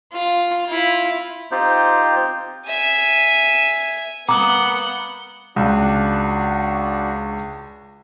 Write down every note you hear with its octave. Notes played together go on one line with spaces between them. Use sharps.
F4
E4 F4
C4 D#4 F4 G4 C5
E5 G#5
A#3 B3 F#5 A#5 D6 D#6 G6
C#2 D4 F#4